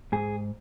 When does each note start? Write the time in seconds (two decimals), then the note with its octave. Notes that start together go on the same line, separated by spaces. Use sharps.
0.12 G#2 G#4